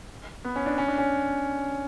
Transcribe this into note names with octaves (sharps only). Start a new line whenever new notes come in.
B3
C#4
D4
C#4
D4
C#4